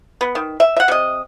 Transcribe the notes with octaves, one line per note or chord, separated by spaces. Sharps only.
B3
D#3
E5
E5 F#5
C3 D#5